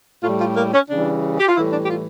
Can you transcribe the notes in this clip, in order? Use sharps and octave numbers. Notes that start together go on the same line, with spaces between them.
A2 G3 F4
F4
A#3
C#4
C#3 E3 G3 D4
G4
F4
A2 E3 G3 E4
D4
G4
F4